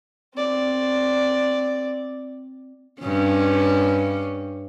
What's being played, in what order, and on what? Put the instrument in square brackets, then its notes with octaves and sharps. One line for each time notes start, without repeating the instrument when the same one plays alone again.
[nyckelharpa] C4 D5
[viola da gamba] G2 C#4